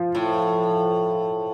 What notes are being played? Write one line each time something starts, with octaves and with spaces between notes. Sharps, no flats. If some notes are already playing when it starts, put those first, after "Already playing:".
Already playing: F3
A2